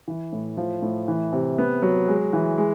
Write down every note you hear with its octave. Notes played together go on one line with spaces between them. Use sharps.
E3
A2
F3
A2
E3
C3
B3
F#3
G#3
E3
G#3